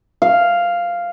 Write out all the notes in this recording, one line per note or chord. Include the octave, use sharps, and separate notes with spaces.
F5